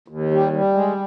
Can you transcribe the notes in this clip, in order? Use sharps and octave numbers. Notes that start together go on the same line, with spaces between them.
D#2
G3
G3
G#3